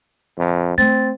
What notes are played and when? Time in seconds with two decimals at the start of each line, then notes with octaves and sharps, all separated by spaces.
0.38 F2
0.78 A3 C4 A6